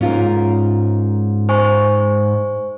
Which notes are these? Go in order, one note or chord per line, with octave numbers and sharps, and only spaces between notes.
G#2 C#4 F4 A#4
C5 G#5 C#6